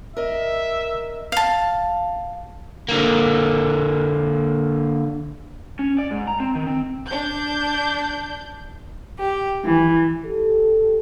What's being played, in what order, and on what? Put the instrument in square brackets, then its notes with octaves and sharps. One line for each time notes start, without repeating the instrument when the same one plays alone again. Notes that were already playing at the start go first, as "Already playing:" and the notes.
[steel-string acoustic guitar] A#4 D#5 [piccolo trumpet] E5
[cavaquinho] F5 A5
[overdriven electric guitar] D3 A#3
[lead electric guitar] C#4
D5
G#2
A#5
C4
D#3
C4
[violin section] D4 G6
[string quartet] G4
E3
[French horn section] G4 A4